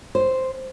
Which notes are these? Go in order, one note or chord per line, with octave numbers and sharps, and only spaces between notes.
C5